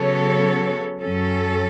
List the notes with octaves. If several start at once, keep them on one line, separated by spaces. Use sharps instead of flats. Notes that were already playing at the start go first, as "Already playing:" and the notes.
Already playing: C#3 F#3 B3 A4 C#5
F#2 F#3 C#4 A4